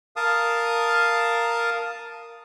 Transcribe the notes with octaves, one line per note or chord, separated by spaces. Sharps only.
A#4 F5 A5 D#6